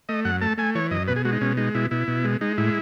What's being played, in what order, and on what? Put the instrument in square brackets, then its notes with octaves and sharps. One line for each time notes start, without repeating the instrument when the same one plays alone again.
[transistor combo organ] A3 D#5
F#2 F#5
A3 A5
A3 G#5
E3 C#5
F#2 D#5
B2 B4
G#4
G#3 F#4
D#4
B2 C#4
G#3 D#4
B2 E4
B2 E4
B2
G#3
G#3 D#4
A2 E4